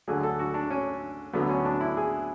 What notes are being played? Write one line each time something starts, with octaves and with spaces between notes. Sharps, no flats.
D2 D3 F#3 G#4
A4
F#4
D4
C#4
D2 D3 F#3 B3
C#4
D4
E4
G#4